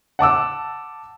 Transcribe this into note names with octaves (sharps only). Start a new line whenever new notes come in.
F#5 A5 D6 E6